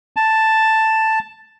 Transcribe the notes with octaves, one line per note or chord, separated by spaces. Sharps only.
A5